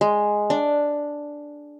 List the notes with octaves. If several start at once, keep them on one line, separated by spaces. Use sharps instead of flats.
G#3
D4